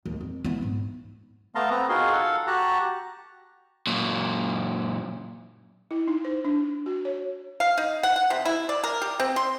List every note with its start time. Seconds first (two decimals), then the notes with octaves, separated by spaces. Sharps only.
0.06 D#2
0.21 F2
0.45 B3 E4
0.62 G#2
1.55 A3 B3 F5 A5 A#5 C6
1.71 B3 C4 B4 A#5
1.89 D#4 F4 F#4 G#4 A#4 C6
2.12 A4 F5 F#5
2.47 F#4 G4 A5 A#5 F#6
3.87 F#2 A#2
5.91 E4
6.08 D#4
6.25 C5
6.45 D4
6.86 F#4
7.05 C#5
7.60 F5
7.78 D#4
8.03 F#5
8.16 F#5
8.30 C3
8.45 E4
8.69 D5
8.84 A#4
9.02 G4
9.20 C4
9.36 C6